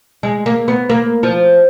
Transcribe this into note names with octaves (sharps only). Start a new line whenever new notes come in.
G#3
A#3
B3
A#3
F3